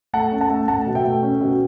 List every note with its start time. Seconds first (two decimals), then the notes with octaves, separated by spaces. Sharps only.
0.13 A3 F#5 A5
0.32 C#4
0.41 F#5 A5
0.50 A3
0.68 A3 F#5 A5
0.86 B2
0.95 E5 G5
1.05 A3
1.23 C#4
1.41 B2